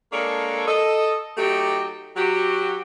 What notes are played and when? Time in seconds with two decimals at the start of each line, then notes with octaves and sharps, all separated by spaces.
0.12 G#3 A#3 D4 A4 A#4 C#5
0.67 A4 D#5
1.37 F#3 A3 D#4 G4
2.17 F#3 F#4 G4